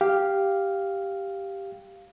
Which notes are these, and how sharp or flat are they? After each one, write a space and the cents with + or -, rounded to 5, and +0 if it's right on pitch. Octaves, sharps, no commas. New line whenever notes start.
G4 +0 F5 +0